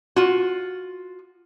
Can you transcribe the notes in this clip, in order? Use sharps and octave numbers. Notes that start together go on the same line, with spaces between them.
F4 F#4